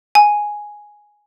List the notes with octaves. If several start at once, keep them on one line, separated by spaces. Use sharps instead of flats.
G#5